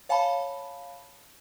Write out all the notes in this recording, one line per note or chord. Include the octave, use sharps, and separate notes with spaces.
C#5 F5 G#5 A5 B5